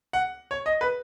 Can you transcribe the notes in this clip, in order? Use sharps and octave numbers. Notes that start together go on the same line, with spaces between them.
F#5
C#5
D#5
B4